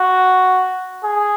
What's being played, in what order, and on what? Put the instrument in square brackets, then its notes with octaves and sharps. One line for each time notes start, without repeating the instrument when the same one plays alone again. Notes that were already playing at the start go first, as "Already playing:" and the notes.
Already playing: [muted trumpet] F#4
G#4